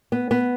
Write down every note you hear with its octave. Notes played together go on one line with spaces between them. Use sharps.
B3
B3